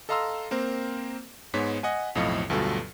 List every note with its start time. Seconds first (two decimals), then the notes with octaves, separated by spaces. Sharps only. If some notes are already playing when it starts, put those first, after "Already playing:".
0.09 A4 D#5 F5 A#5 C6 E6
0.51 A#3 C4 A#4 C5
1.54 G#2 G#3 B3 C#5 B6
1.83 D#5 F#5 G#5
2.15 B1 F2 A2 D#5 F5 C#7
2.50 D2 G2 B2 F#3 F4 A4